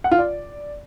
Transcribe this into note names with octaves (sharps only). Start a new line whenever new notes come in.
F#5
F4
D5